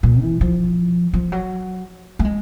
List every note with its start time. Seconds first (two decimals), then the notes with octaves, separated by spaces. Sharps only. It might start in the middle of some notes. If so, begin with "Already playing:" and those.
0.03 A#2
0.21 E3
0.41 F3
1.13 F3
1.32 F#3
2.19 A3
2.25 G#3